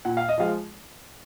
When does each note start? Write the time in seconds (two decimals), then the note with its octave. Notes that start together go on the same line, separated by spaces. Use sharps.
0.05 A#2 F#5
0.17 F5
0.29 D#5
0.38 F3 G#3 F5